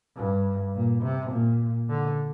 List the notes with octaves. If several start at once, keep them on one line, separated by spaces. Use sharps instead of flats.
G2
A#2
C3
A#2
D3